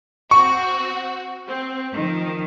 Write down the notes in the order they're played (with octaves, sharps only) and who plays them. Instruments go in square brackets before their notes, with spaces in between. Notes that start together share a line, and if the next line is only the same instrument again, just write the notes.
[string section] C4 F#4 [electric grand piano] C#6
[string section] C4
D#3 F3